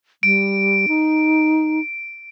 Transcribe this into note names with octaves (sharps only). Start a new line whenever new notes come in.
G3 D7
D#4